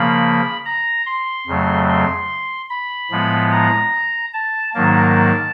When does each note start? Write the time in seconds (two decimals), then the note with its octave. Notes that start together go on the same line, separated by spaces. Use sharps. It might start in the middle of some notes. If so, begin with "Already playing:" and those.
Already playing: C#3 F3 A#3 B5
0.65 A#5
1.06 C6
1.47 F2 C#3 F#3 A3
1.88 C6
2.70 B5
3.11 A2 F3 G#3 B3
3.52 A#5
4.33 A5
4.74 G#2 D#3 F#3 A#3 A5